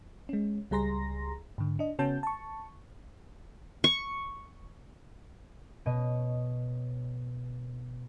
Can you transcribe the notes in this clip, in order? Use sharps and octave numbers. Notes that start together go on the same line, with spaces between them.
G#3 C#4
C#2 G3 G#4 A#5 C6 A#6
G#2 D3
D4 D#5
C#3 B3 C#4 F#4 A5 G6
A5 C#6
C#6
B2 C#5 D#5 D#7